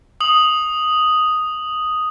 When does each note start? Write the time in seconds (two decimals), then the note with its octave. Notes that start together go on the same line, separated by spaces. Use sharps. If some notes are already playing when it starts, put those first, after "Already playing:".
0.21 D#6 F#7